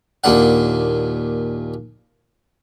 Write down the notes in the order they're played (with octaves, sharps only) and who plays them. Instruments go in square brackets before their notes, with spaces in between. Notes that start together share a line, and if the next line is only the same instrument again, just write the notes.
[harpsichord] D#2 A#2 D4 F#5